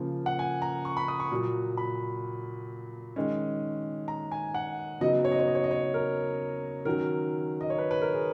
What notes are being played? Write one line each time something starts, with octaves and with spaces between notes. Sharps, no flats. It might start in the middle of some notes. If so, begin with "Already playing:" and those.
Already playing: C#3 F3 A#3
F#5
G#5
A#5
C#6
B5
D#6
C#6
A#2 F#3 A#3
B5
D#3 G#3 C#4
A#5
G#5
F#5
C#3 F#3 B3 D#4 D#5
C#5
D#5
C#5
D#5
C#5
D#5
C#5
A#4
D#3 F#3 C#4 A#4
D#5
C#5
B4
B4
A#4
G#4